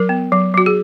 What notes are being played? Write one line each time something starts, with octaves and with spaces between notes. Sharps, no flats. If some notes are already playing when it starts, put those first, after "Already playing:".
Already playing: F#3 A#4
B3
F#3
F#3 F#4
G#4